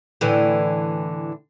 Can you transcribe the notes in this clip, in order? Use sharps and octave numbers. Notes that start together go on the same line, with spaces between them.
A2 D3 E3